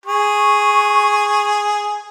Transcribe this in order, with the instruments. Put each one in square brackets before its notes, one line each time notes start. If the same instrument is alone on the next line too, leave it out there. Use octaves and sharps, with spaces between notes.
[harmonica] G#4 [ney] C#6